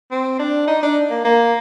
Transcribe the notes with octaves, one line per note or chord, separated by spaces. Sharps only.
C4
D4
D#4
D4
A#3
A#3